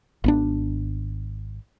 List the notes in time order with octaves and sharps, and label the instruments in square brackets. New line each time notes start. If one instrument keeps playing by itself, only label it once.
[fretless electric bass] G#1 B3 D4